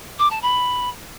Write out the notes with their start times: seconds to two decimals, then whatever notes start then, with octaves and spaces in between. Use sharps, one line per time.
0.19 D6
0.31 A5
0.42 B5